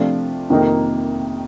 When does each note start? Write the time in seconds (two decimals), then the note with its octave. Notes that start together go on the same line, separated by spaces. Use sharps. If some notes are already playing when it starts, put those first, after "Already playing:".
Already playing: C3 F3 A3 D4 F4
0.50 F2 C3 D#3 A#3 D#4